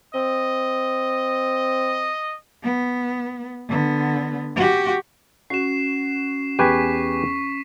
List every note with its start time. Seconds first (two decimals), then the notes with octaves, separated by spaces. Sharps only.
0.15 C4 D#5
2.63 B3
3.69 D3 B3
4.56 F#4 G4
5.50 C#4 F#4 C7 E7
6.59 E2 G4 B4 G#5 C#6 B6